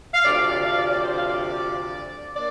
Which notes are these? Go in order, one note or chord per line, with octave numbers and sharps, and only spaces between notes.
F5
D2 C3 F3 D5
D5
F5
D5
D5
C5
F5
D5
A#3 D4 D5